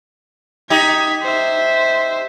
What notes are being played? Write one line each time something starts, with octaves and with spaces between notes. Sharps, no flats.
D#4 G4 G#6 B6
C5 E5